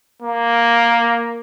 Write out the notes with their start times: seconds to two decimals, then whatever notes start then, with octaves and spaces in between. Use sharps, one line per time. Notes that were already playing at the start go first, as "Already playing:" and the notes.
0.22 A#3